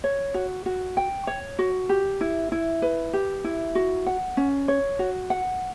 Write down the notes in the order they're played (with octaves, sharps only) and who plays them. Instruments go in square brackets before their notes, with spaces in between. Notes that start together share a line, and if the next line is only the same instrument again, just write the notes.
[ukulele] C#5
F#4
F#4
G5
C#5
F#4
G4
E4
E4
B4
G4
E4
F#4
F#5
C#4
C#5
F#4
F#5